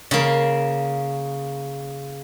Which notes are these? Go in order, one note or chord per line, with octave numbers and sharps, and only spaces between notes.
C#3 A#3